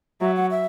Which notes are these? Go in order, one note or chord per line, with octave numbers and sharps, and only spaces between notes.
F#3 E5
F#5
E5